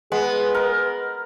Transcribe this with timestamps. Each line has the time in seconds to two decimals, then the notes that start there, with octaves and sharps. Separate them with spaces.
0.12 G#3 B3 G#4 B4
0.55 A#4